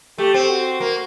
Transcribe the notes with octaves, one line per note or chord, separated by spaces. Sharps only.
A3 G4
C4
F#4
A#3